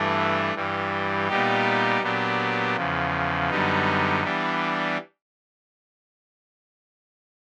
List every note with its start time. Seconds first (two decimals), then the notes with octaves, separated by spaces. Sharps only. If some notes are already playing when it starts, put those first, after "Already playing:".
Already playing: G2 E3 A3 D4
0.54 G2 E3 G3
1.28 A#2 G3 B3 D#4 G4
2.02 A#2 F#3 B3 D4 G4
2.76 E2 C#3 F3
3.50 F#2 D3 G3 B3 D#4
4.24 E3 G3 B3 D4